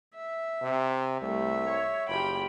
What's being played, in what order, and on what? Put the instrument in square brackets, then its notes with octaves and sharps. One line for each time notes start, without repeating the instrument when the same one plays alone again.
[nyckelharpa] E5
[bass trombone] C3
[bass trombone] C2 [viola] G3 A3 [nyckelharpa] E5
[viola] C#5
[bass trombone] F#1 [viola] F4 G4 [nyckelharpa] G5 B5